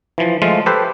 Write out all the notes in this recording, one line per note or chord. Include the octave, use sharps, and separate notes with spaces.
E3 F3
F3 G#3 A3 F4
G4 A4 B4 C5